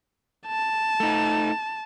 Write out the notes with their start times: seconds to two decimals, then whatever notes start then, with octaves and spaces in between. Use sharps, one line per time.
0.47 A5
1.00 A3 D#4